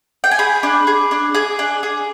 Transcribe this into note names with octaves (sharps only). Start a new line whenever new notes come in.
G5
G#5
G#4 B5
D4
G#4
D4
G#4
D4
G#4